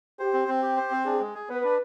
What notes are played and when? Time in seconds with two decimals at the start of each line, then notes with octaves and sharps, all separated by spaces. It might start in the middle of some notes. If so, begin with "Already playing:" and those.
0.19 G4 C5
0.33 C4
0.48 C4
0.62 G4
0.77 C5
0.91 C4
1.05 D4 G#4
1.20 G#3
1.35 G#4
1.49 B3 B4
1.64 D4